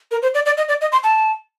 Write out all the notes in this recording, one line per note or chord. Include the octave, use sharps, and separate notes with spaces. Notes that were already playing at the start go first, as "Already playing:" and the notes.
A#4
C5
D5
D5
D#5
D5
D#5
C6
A5